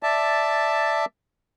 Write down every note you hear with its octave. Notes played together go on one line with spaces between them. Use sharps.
D5 E5 A5